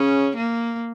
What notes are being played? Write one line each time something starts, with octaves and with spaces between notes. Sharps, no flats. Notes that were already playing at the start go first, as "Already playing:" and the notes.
Already playing: C#3 C#4
A#3